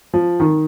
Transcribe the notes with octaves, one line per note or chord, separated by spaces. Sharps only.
F3
D#3